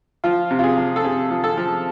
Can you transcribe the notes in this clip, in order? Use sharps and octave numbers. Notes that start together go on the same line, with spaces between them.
F3 F4
C3
F4
G#4
F3
A4
C3 G#4
F3
A4
F3